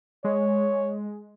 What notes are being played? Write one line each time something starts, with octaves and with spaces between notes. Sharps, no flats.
G#3 C#5